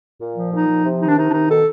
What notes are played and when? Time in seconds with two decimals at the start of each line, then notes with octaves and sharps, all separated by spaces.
0.20 A#2
0.36 F3
0.52 A#2 D#4
0.68 F3
0.85 C3
1.00 D#3 D#4
1.08 D4
1.16 C3 D#4
1.29 D4
1.33 D#3 D#4
1.49 B2 A4